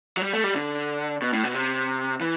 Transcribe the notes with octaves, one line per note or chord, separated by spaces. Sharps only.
F#3
G3
A3
G3
D3
B2
A2
B2
C3
E3